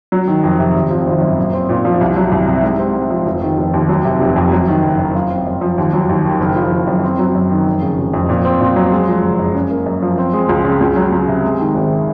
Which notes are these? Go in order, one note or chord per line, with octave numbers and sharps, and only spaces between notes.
F#3
D#3
F2
C3
G#1
F3
G#1
F#2
A#2
C4
A#2
F3
C2
F#3
C2
C3
G#2
C4
G#2
F3
F1
D#3
F1
D#2
F#3
C3
F1
F2
F#3
D#3
F#1
F#2
F4
C4
F#2
F3
D#2
F#3
D#2
D#3
F#1
F3
F#1
F#2
C4
F#3
F#2
D#3
F1
C#3
F1
F2
A#2
C4
A#2
F#3
G#3
F3
F#1
F#2
C#4
A#3
F#2
F3
C4
G#3
C#2
C#3
C#2
F#3
C#2
C3
G#3
D#3
G#1